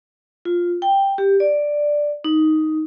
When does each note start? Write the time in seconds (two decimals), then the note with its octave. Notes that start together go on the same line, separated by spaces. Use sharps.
0.45 F4
0.82 G5
1.18 G4
1.40 D5
2.24 D#4